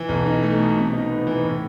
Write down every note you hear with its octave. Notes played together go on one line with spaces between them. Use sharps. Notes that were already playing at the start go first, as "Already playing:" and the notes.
Already playing: E3
B1
D#4
A3
B2
C3
D#4
B3
E3
A2